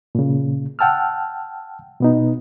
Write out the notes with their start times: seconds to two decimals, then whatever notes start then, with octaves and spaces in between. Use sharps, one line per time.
0.15 A#2 C#3
0.79 F#5 G5 A5 E6 F6
2.00 B2 B3 D#4